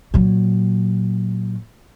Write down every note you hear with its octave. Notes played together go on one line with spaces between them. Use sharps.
A#2 F#3